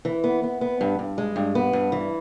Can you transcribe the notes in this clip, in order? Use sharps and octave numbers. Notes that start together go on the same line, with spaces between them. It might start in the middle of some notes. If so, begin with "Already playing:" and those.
E3
B3
B3
B3
G2
G2
G#3
G2
B3
G2
E3